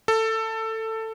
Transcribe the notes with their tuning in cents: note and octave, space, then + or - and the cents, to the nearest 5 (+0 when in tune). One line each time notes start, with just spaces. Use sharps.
A4 +15